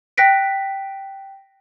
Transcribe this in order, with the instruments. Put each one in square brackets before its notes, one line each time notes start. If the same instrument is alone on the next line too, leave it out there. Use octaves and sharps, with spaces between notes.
[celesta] G5 F#6 A#6 B6 D7